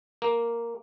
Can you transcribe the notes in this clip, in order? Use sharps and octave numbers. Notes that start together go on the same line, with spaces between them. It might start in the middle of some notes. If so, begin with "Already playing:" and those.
A#3